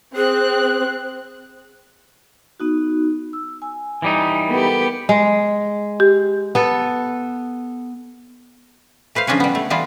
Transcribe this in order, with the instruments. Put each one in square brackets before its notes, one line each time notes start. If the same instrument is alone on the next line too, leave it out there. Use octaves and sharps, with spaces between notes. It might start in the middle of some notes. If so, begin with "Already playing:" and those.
[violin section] C4 F#6 [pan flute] G#4
[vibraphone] B3 D#4 F#4
E6
G#5
[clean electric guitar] E3 G3 D#4
[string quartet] B3 G4 [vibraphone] A4 A#4
[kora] G#3
[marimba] G4
[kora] B3 A4
[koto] A3 B4 C5 F5
C#3 F3 C#4 D4 B4 C#5
G3 B3
A3
E3 G3 B3 F4